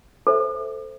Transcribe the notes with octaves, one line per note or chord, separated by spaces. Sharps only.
A4 C5 E5